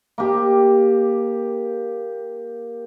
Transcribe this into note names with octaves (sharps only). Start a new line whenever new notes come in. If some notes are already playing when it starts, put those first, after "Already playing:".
A#3 G4